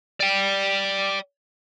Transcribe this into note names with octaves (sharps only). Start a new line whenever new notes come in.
D5 G5